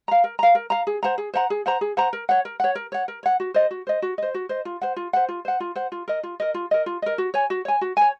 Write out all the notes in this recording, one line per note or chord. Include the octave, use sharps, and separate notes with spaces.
F5 A#5
A#4
F5 A#5
A#4
F5 A#5
G#4
C5 F#5 A#5
G#4
C5 F#5 A#5
G#4
C5 F#5 A#5
G#4
C5 F#5 A#5
A#4
C#5 F#5
A#4
C#5 F#5
A#4
C#5 F#5
A#4
C#5 F#5
F#4
C5 D#5
F#4
C5 D#5
F#4
C5 D#5
F#4
C5 D#5
F4
C5 F#5
F4
C5 F#5
F4
C5 F#5
F4
C5 F#5
F4
A#4 D#5
F4
A#4 D#5
F4
A#4 D#5
F4
A#4 D#5
F#4
C#5 G#5
F#4
C#5 G#5
F#4
C#5 G#5